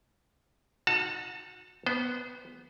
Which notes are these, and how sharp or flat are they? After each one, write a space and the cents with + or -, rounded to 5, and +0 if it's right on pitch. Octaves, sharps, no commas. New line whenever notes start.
D#4 +0 F#4 -25 A5 +25
B3 +0 C5 -30